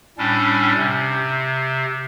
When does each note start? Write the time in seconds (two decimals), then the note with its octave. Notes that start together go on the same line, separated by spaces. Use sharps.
0.18 A2 G3 C#4 D4
0.76 C3